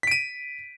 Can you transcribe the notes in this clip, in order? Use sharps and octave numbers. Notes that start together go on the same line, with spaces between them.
B6 D7 D#7